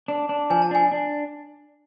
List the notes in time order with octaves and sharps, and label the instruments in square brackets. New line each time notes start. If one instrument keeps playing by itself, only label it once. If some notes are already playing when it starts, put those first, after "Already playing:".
[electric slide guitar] D4
D4
[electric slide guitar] F3 [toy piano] G#5
[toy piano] A5
[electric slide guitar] D4 [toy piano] G#5
[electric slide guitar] D4